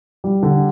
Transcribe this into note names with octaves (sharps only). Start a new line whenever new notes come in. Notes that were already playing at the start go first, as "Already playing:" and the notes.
G3
D3